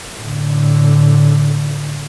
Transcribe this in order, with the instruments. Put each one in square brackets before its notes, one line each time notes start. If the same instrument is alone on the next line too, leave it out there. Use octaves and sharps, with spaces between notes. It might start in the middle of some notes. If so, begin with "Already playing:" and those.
[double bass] A2 D3